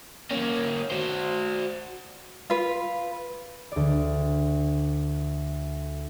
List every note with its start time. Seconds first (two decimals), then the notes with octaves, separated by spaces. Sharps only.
0.31 A#3 C#4
0.91 F#4 C5
2.50 F4 B4
3.72 D2 D5